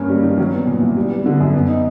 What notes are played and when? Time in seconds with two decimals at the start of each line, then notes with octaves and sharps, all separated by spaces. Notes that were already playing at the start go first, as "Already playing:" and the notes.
Already playing: G2 A#3 C#4
0.09 G3
0.23 D#3
0.38 F#3
0.53 B3
0.67 A#2
0.81 C2
0.97 G3
1.10 B3
1.26 D3
1.40 F#2
1.54 B3
1.68 D#4